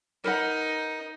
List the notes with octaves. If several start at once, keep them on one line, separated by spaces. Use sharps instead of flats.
D#4 A#4 B4 F#5